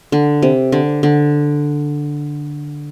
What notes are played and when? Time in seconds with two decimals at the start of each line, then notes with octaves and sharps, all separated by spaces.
0.12 D3
0.42 C3
0.72 D3
1.03 D3